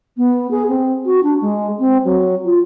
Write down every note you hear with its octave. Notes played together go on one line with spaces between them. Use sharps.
B3
G#4
C4
F#4
D4
G#3
C4
F#3
F4